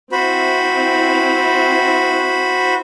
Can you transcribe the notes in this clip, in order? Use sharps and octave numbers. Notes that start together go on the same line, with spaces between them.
C4 E4 F#4 C5 B5